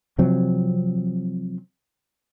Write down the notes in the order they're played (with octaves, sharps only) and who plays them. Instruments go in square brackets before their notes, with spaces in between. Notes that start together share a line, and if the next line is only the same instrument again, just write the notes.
[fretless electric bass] C3 F3 F#3 C4